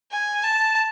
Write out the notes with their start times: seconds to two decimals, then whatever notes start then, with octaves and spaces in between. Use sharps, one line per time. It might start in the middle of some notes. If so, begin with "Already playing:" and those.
0.11 G#5
0.44 A5